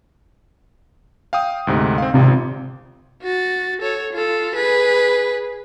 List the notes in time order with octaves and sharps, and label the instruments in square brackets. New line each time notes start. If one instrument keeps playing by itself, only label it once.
[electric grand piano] F5 G5 D#6
D2 G#2 C3
C4 F5
[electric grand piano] G#1 F4 [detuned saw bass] C3
[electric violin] F#4 A6
A4 C#5
F4 A4
G#4 B4